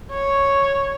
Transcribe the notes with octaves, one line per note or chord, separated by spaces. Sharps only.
C#5